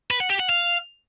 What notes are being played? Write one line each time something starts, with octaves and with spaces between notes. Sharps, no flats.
B4
F#5
G4
F#5
F5